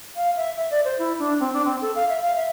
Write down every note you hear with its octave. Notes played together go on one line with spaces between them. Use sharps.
F5
E5
E5
D5
C5
E4
D4
C4
D4
C4
A4
F5
E5
F5
E5